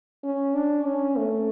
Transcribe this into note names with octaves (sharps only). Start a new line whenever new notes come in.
C#4
D4
C#4
A3